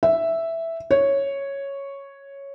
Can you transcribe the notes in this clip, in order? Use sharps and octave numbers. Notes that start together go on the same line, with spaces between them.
E5
C#5